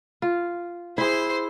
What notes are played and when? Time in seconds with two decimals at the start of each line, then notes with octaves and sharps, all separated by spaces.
0.22 F4
0.98 E4 G#4 C5 C6